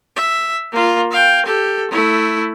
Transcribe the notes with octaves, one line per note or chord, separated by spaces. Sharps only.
E5
A#3 F4
F5 G5
G4 A4
A3 E4